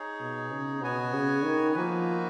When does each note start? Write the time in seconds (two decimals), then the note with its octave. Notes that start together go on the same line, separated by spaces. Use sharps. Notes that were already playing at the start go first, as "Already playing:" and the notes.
Already playing: D#4 G#4 C#5
0.20 B2
0.51 C#3
0.82 B2 B3 F#4 C#5 G#5
1.13 C#3
1.44 D#3
1.75 F3 A#3 D#4 F#4 B4